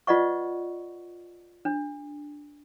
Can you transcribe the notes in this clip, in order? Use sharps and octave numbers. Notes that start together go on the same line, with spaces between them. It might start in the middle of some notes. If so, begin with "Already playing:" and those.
F4 B4 D5 D#5 F#5 C#6
D4